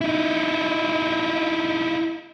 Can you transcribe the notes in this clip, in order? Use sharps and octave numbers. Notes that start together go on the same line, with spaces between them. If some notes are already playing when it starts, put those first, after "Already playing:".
D#4 E4